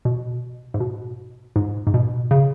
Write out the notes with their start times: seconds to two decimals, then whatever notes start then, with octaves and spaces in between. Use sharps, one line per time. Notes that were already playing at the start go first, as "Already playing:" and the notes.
0.05 B2
0.74 G#2
0.80 B2
1.56 G#2
1.87 G#2
1.94 B2
2.31 C#3